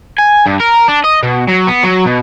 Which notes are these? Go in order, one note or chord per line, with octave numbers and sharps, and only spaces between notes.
G#5
G2
A#4
D4
D#5
B2
F#3
B3
F#3
B2